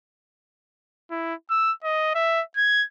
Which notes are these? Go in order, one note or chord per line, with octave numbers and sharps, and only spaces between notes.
E4
E6
D#5
E5
G#6